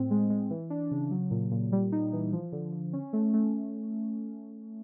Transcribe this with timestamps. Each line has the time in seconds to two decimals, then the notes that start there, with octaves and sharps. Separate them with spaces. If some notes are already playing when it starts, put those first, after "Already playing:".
Already playing: A2 C4
0.11 G#3
0.30 G#3
0.50 E3
0.70 D4
0.91 C#3
1.11 F#3
1.31 A#2
1.51 A#2
1.72 G3
1.92 D#4
2.13 E3
2.33 F3
2.52 D3
2.72 D3
2.93 C#4
3.13 A3
3.34 A3